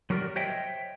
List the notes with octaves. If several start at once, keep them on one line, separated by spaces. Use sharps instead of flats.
F#3 F#4 G4 A#4 B4 D5
C5 C#5 D#5 E5 G5